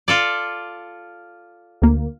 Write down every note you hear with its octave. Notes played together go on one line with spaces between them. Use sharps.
F4 A4 D5
D2 A#3